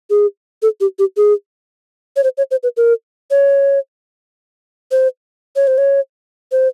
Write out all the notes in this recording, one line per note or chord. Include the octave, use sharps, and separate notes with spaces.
G#4
A4
G4
G4
G#4
C#5
C5
C#5
C5
B4
A#4
C#5
C5
C#5
C5
C#5
C5